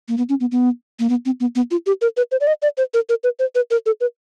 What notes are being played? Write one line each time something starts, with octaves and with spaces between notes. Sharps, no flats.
A#3
B3
C#4
B3
B3
A#3
B3
C4
B3
B3
F4
G4
A#4
B4
C5
D5
D#5
D5
C5
A#4
A#4
B4
C5
B4
A#4
A4
B4